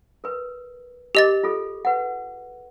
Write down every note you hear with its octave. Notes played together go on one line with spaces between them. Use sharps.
A#4 B4
G4 A#4 D#5 D6 A6
F4 G#4 A4
B4 F#5